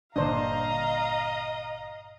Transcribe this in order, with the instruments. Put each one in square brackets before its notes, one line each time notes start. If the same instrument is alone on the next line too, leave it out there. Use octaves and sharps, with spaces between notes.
[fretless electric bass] G1 A#2 D3 [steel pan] D4 C5 [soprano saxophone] D#5 [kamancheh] F5 A#5